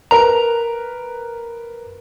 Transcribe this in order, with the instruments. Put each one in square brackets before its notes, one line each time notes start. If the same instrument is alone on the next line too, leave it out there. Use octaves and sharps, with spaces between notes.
[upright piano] A#4 B4 [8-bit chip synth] A#5